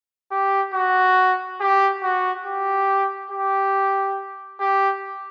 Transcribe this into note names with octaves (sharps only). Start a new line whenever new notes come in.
G4
F#4
G4
F#4
G4
G4
G4